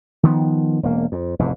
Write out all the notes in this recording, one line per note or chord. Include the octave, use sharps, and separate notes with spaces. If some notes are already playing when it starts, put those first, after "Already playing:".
D#3 F3 B3
E1 A#3
F2
F1 E2 G#2